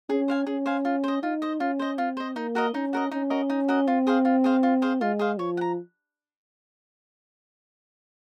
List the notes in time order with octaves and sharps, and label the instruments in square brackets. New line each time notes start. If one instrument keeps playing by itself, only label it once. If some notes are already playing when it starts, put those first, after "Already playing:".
[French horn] C#4 [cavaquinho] G#4
[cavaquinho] C5 F5 G#5
[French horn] C#4 [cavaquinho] G#4
[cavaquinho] C5 F5 G#5
F4
C5 D#5
[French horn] D#4 [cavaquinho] F4
[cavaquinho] C5 D#5
[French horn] C#4 [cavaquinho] F4
[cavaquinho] C5 D#5
[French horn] C4 [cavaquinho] F4
[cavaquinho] C5 D#5
[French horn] A#3 [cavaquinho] D#4
[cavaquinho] F#4 A#4 D#5
[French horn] C#4 [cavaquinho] D#4
[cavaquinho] F#4 A#4 D#5
[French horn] C#4 [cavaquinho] D#4
[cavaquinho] F#4 A#4 D#5
D#4
F#4 A#4 D#5
[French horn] C4 [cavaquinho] F4
[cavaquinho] G#4 C5 F5
F4
G#4 C5 F5
F4
G#4 C5 F5
[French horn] G#3 [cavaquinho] F4
[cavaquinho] G#4 C5 F5
[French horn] F3 [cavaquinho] C#5
[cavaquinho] F#5
A#5